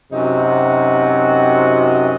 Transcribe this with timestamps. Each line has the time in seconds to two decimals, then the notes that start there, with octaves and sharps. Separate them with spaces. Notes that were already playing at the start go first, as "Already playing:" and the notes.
0.13 F#2 C3 D#4 F#4